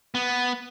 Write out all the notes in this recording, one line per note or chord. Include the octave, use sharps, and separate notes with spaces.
B3